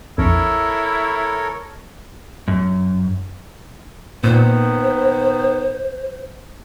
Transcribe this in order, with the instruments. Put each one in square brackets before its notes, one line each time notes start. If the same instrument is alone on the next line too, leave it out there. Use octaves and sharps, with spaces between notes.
[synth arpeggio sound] A#1 F2 [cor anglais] E4 [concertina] A4 A#4 C#5
[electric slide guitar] F#2
[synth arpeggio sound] A#2 [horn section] D#3 B3 [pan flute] C5